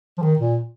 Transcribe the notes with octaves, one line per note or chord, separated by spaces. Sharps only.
F3
D#3
A#2